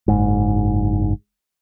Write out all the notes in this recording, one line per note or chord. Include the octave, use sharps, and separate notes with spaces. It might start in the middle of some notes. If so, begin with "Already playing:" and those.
F#1 G#2